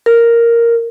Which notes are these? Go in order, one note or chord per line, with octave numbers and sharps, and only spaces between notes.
A#4